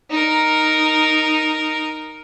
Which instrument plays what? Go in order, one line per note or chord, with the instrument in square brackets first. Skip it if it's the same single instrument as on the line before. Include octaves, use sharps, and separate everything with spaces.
[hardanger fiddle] D#4 A#4